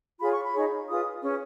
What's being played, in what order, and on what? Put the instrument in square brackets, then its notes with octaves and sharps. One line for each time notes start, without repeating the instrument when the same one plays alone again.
[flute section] F4 G#4 C#5 B5
C#6
B5
D#4 G#4 C#5
F4 G#4 B4 D#6
C#4 G#4 B4